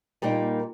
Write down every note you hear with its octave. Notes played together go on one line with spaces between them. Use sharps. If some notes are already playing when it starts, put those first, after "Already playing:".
A#2 G3 A#3 D#4